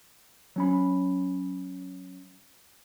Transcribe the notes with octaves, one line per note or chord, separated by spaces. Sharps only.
F#3 C#4 B5